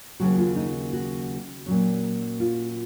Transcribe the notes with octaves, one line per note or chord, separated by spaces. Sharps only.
D#2 C#3 F#3 F#4
F4
D#4
F#4
A#2 F#3 C#4
F4